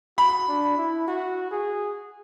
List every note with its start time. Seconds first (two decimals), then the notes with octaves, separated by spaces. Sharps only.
0.18 F#4 B5
0.48 D4
0.77 E4
1.07 F#4
1.51 G#4